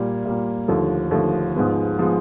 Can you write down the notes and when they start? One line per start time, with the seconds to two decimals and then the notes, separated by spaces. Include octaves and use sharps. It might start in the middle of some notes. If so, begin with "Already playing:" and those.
Already playing: A#2 G3 A#3
0.25 A#2 G3 A#3
0.68 D#2 D3 F3 A3
1.11 D#2 D3 F3 A3
1.55 G#2 F3 G#3 B3
1.98 F3 G#3 B3